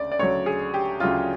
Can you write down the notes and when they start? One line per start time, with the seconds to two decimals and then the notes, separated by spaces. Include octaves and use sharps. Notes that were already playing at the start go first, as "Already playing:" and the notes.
Already playing: D2 C#3 D5
0.12 D5
0.19 D2 C#3 F#3 C#5
0.46 G#4
0.74 G4
1.00 D2 C#3 F#3 F4